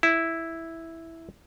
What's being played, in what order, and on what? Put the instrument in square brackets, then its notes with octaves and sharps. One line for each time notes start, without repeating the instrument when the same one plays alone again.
[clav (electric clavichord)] E4